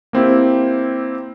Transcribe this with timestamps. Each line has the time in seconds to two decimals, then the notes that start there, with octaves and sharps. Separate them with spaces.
0.13 A#3 C4 E4 G4